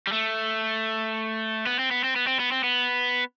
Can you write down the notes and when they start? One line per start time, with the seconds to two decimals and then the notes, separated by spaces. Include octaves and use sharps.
0.07 G3
0.12 A3
1.67 B3
1.79 C4
1.91 B3
2.04 C4
2.16 B3
2.27 C4
2.40 B3
2.52 C4
2.64 B3